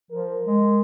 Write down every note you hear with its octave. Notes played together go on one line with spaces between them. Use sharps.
F3 A#4
G#3